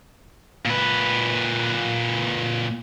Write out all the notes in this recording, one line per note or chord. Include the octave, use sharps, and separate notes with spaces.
A#2 B4